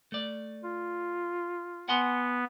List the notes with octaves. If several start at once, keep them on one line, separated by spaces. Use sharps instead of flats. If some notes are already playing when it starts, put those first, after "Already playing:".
A3 D5
F4
B3 F#5 G#5 C6